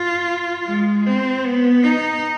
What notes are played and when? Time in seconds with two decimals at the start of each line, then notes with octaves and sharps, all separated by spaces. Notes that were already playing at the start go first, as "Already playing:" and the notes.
Already playing: F4
0.68 G#3
1.07 C4
1.46 B3
1.84 D#4